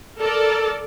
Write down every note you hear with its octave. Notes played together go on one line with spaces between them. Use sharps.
A4 A#4 D5